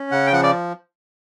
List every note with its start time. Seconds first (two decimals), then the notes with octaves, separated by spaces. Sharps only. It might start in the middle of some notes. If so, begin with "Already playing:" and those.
Already playing: C#4
0.11 C#3 F#5
0.27 G5
0.33 F3 F#5
0.43 D5